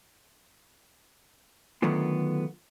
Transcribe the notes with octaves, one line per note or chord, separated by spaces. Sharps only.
D3 D#3 F#3 A3 B3 F4